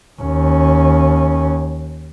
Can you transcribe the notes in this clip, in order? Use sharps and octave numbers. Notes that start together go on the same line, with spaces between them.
D#2 C#4